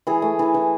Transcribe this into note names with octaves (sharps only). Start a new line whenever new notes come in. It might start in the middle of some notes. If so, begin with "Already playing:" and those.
E3 G#4
A3
E3
E3